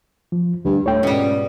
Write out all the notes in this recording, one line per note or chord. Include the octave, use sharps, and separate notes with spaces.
F3
D2 G2
A2 C#5 G5
C#2 G#2 B2 G3